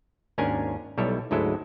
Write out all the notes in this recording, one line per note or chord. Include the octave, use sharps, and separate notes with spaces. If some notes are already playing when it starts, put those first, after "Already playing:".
G#1 D#2 C#4 D4 A#4 G#5
B1 G3 E4 A4 C#5
D2 G#2 F#3 G#3 E4 A4